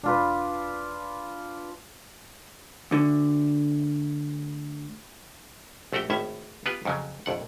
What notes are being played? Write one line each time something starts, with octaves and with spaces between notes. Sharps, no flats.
E1 D4 F4 B4
D2 D3
A#1 A3 F#4 G4 G5
G#1 A2 C#4 E5
B3 F4 G4 B4
F2 C#3 F#3
A#1 F2 F#5